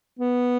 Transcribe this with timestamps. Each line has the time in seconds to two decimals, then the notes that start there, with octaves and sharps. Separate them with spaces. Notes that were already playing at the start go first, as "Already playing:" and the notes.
0.19 B3